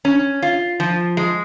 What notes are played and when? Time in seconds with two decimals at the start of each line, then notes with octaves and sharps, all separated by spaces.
0.05 C#4
0.43 F4
0.80 F3
1.17 G#3